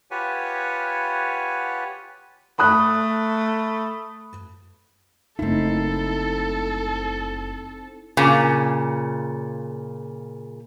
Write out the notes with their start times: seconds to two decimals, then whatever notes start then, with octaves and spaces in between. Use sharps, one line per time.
0.11 F4 G4 B4 C#5 F#5 G#5
2.59 A3 B5 D#6 F#6
5.39 F#1 A3 C4 D#4 E4 A4
8.17 A#2 C#3